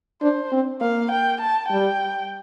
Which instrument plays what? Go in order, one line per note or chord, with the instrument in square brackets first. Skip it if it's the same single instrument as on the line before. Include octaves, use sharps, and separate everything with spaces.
[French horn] D4 [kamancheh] C5
[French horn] C4
[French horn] A#3 [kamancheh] F5
[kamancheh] G5
A5
[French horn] G3 [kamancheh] G5